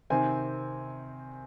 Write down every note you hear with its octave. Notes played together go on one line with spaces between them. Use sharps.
C3 D#3 C4 G#5